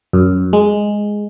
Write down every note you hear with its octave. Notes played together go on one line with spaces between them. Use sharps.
F#2
G#3